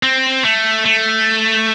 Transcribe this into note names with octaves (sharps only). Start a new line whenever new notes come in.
C4
A3
A3